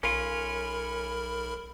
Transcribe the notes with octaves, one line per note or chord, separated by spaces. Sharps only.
B1 C#4 F4 A#4 B5